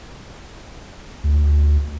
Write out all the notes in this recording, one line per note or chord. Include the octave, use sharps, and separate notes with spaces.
D2